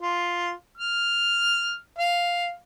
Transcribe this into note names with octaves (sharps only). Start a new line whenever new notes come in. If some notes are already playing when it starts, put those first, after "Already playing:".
F4
F6
F5